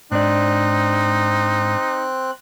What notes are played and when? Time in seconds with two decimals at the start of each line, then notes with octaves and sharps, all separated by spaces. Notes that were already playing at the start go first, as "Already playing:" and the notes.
0.11 G#2 C4 D4 D#4 D5 F#6